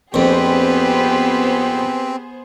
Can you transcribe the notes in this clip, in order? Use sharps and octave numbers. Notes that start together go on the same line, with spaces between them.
A#1 F2 B3 C4 G4 G#4 B4 C5